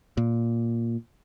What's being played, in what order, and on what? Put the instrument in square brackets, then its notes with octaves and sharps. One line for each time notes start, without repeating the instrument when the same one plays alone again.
[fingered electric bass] A#2